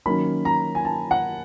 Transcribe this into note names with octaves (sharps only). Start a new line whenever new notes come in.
D#3 F#3 A#3 C#4 B5
A#5
G#5
A5
F#5